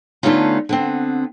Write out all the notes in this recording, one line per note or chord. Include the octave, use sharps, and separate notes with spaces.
D3 A3 B3 C#4 D#4 F4
D3 B3 C4